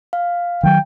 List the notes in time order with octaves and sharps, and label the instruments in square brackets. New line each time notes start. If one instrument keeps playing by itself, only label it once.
[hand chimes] F5
[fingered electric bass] D#3 F#3 [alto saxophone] G5